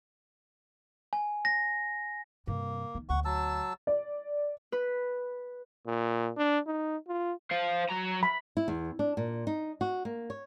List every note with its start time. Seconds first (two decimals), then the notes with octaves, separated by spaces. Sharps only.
1.13 G#5
1.45 A#6
2.47 G2 C3 A#3
2.95 D#3
3.09 D2 F#5 C#6
3.25 F#3 A5 E6
3.87 D5
4.72 B4
5.87 A#2
6.37 D4
6.67 D#4
7.08 F4
7.51 C5 F5
7.90 F#3 A#5
8.23 B5
8.57 E4
8.68 E2
8.99 D4
9.17 A#2
9.47 D#4
9.81 F#4
10.05 A#3
10.30 C#5